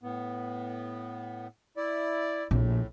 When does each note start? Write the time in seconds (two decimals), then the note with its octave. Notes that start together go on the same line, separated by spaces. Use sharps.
0.03 A2 B3
1.77 E4 D5
2.51 A#1 A2